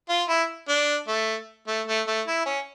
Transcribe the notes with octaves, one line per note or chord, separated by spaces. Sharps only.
F4
E4
D4
A3
A3
A3
A3
E4
C#4